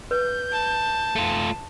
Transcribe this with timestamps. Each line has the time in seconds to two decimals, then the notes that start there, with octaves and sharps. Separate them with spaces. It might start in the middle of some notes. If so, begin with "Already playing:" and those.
0.11 B4 G6
0.53 A5
1.16 A3 F4